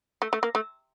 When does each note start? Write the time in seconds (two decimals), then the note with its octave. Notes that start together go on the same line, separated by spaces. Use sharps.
0.22 A3
0.33 A3
0.43 A#3
0.55 A3